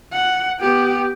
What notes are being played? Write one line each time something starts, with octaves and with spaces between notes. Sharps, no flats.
F#5
B3 G4